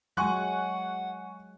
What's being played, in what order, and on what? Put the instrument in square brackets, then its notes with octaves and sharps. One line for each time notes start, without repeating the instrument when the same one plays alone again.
[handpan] F#3 G#3 [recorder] F#5 [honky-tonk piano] G#5 C#6 F#6